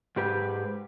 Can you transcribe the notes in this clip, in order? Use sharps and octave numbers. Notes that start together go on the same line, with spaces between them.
G#2 G4 B4